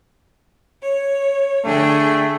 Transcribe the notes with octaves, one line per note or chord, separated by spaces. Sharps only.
C#5
D3 A3 G#4 G5